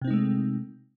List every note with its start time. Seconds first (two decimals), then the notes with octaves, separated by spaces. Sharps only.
0.02 C3
0.04 C4
0.07 D#4
0.10 G#3
0.13 A3